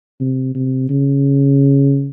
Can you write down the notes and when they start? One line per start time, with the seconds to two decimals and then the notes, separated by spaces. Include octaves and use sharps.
0.20 C3
0.55 C3
0.90 C#3